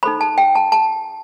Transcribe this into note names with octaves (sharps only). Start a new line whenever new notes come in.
D#4 A4 C5 B5
A5
G5
A5
A5